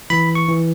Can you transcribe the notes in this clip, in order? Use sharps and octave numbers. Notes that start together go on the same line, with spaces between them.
E3 B5
C#6
E3